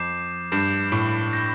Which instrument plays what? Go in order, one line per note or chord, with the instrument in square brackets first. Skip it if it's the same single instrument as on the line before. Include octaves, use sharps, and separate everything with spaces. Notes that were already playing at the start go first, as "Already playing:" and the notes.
Already playing: [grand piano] F2 [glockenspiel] D6 G6 C7 E7
[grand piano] G2 [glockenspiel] G6 C7 E7
[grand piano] A2
[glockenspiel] G6 A#6 E7